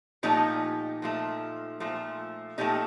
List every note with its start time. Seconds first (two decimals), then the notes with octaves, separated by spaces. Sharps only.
0.23 A#2 F3 A3 D#4 G4
1.02 A#2 F3 A3
1.80 A#2 F3 A3
2.58 A#2 F3 A3 D#4 G4